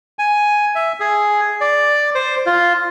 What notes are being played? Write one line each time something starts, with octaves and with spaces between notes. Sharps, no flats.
G#5
E5
G#4
D5
C5
F4